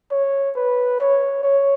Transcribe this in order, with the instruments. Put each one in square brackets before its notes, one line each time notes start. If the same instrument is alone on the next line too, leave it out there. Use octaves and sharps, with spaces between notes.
[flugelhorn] C#5
B4
C#5
C#5